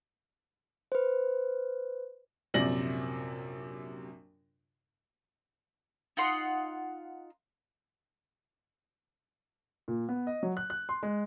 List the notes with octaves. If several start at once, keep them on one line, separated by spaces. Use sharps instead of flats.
B4 C5
A#1 F#2 C3 D5 A#6 F#7
D#4 F4 F#5 C6
A#2
B3
D#5
F#3
F#6
F#6
C6
G#3